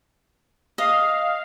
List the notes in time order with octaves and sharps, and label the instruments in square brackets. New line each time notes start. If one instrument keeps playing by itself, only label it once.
[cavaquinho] D#5 [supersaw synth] F5